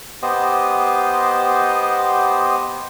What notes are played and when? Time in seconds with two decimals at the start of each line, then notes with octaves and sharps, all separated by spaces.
0.22 B3 G4 C5 D#5